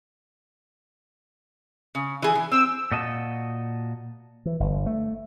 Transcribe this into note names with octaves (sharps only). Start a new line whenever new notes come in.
C#3
E3 G#4
E3
C4 E6
A#2 F#4 D#5 A5
E3
G1
A3